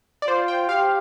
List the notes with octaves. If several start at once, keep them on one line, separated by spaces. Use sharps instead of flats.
D5
F4 C5
G5
G4 F5